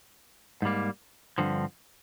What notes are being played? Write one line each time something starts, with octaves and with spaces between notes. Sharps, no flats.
G#2 G3 A#3
G2 D3 F3 C4